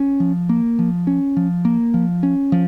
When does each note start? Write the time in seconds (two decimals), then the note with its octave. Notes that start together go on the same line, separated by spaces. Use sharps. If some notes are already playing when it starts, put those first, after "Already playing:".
Already playing: C#4
0.20 F3
0.49 A#3
0.79 F3
1.07 C#4
1.37 F3
1.65 A#3
1.94 F3
2.23 C#4
2.52 F3